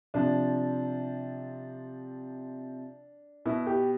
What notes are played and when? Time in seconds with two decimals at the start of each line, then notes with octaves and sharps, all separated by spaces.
0.14 C3 F3 D4
3.46 B2 E4
3.67 G4